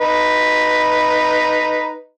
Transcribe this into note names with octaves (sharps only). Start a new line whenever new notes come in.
D#4 B4